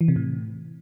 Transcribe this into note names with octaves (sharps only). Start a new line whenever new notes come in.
E3
C3
A2